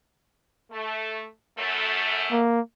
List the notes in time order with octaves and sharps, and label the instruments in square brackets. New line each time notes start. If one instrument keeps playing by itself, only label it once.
[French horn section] A3
F#2 A3
[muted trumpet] A#3